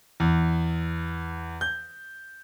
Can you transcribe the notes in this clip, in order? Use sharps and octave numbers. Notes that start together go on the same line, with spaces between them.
E2
G6